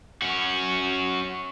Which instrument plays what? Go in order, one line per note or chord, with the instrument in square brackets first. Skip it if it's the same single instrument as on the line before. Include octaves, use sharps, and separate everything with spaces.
[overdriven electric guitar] C#4 F#4